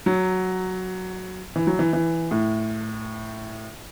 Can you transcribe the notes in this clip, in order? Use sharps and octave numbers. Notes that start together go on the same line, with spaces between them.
F#3
E3
F#3
E3
E3
A2